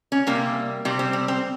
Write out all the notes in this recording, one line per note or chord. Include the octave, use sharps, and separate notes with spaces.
C#4
C3 G3 A#3
C3 G3 C4
C4
C4
C4